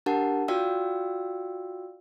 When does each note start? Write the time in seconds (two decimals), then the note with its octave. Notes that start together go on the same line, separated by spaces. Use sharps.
0.06 D4 G4 A#4 F#5 A5
0.48 F4 F#4 D5 F5 G5 E6